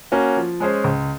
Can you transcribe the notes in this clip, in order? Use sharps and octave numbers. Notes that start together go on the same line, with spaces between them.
A#3 C#4 F#4
F3
G#3 C#4 G#4 C5
C#2